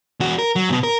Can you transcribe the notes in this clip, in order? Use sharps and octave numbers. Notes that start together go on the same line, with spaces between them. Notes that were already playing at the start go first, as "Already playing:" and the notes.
E2 F#4
A#4
F#3
G#2 B2
A#4